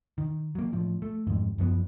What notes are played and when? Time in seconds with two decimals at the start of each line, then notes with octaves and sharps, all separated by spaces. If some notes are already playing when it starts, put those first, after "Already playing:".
0.18 D#3
0.55 F#3 A#3
0.73 A2 F3
1.02 A3
1.27 G#1 F2 G#2
1.58 F#2 F3 B3